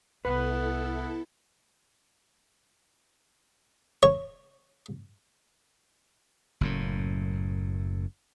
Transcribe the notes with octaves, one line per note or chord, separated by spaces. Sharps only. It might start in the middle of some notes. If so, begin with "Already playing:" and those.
C2 B3 E4 A4 B4
C#5
F#1 F#2 A2